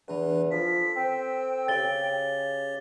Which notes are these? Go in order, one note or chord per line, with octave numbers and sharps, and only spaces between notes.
E2 E3 D4 B4
F3 A4 B6
C4 G5
C#3 G4 C#5 A6 G7